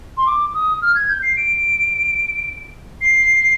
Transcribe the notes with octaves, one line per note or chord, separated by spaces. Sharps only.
C6
D6
D#6
F6
G#6
G6
C7
D7
C7